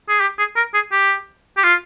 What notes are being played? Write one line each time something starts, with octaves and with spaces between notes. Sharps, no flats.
G#4
G4
G#4
A#4
G#4
G4
G4
F4